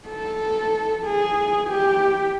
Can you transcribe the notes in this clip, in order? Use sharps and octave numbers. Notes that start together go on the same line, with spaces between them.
A4
G#4
G4